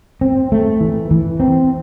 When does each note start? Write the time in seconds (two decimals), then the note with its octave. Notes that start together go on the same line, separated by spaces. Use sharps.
0.21 C4
0.52 A3
0.81 E3
1.11 E3
1.40 C4